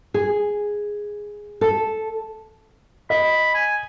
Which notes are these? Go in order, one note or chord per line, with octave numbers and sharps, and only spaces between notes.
G#4
A4
D#5 B5
G#5